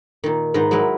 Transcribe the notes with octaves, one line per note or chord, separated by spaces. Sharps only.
A#2 D#3
G#2 D#3 B4 C5 A#5
F#3 G#3 E4 A#4 B4